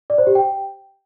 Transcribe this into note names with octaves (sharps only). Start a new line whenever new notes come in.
D5
C5
G4
G5